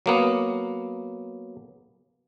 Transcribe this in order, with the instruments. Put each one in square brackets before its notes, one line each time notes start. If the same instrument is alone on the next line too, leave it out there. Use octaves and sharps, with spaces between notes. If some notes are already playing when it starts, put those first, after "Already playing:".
[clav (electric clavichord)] F#3 A#3 B3